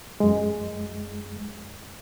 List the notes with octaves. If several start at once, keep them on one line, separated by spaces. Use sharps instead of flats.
F#2 G#3